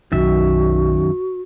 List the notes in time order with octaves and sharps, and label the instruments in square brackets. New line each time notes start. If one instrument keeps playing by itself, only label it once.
[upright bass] B1 [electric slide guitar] F#2 D#3 E5 [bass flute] F#4